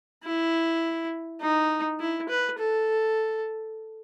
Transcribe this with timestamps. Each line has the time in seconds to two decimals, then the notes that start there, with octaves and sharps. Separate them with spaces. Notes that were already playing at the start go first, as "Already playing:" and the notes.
0.25 E4
1.42 D#4
2.00 E4
2.29 B4
2.58 A4